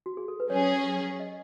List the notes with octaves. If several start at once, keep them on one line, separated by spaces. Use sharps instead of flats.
F#4
G#4
A4
B4
F#3 C#4 G#4 C#5
D#5